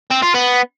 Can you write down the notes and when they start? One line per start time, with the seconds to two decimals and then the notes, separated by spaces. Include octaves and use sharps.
0.11 C4
0.23 F4
0.34 B3